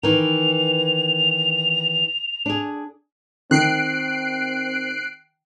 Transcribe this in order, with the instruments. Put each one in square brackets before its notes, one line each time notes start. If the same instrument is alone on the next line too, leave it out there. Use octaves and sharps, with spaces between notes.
[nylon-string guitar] D#3 E3 [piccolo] F7
[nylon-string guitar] D4 G#4
[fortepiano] D#3 [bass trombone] C4 [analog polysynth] F#6 C7 D7